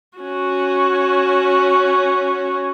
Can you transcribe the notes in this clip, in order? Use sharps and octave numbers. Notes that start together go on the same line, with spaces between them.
C#4 F#4